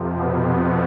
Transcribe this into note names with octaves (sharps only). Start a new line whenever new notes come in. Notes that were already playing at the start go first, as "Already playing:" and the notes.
Already playing: F2 C3 F3
B2 B3